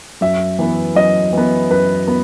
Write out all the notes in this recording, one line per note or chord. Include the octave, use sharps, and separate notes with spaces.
F#2 E5
E3 B3
F#2 D#5
E3 B3
F#2 B4
B3